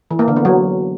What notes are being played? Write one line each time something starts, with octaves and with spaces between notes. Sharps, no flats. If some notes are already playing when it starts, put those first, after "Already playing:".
E3
A#3
D3
B3
F#3